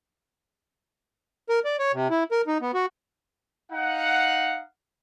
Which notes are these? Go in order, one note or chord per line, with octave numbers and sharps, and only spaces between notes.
A#4
D5
C#5
C3
E4
A#4
D#4
B3
F#4
D#4 F5 F#5